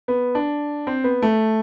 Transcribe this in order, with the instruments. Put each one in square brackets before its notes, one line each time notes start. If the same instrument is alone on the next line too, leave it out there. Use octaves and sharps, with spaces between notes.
[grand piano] B3
D4
C4
B3
A3